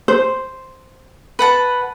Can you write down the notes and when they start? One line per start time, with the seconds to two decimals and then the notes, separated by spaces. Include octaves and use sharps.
0.08 C5
1.39 B4 F#5 A5